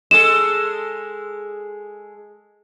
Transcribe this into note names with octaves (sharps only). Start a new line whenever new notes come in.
G#3 G#4 A4 E7